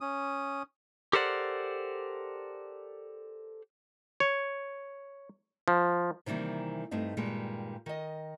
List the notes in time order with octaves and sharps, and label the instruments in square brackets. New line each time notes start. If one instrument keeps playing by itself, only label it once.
[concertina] C#4 D#6
[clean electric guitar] G4 A4 A#4 C5 D5 F#5
[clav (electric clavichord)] C#5
F3
[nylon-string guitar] C3 D#3 E3 G3 A#3
G2 A3 C4 D#4
G2 A#2 D#3 G3 G#3
D#3 D#5